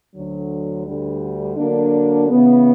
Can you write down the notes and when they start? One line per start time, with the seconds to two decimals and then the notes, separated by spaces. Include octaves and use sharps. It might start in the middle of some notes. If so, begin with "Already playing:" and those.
0.14 D2 D3 F#3
0.86 D2 D3 G3
1.57 D3 F#3 A#3 D4
2.29 C#3 E3 B3